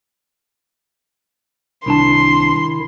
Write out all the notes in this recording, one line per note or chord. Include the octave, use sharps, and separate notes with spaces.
C2 D#3 D4 E4 A5 C6